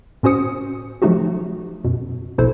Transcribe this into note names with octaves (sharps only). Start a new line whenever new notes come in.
A2 C#4 F#4 C5 D#6 C#7
F3 F#3 A3 D#4 F#4 G4
F#2 B2
A#1 B2 E4 A4 C5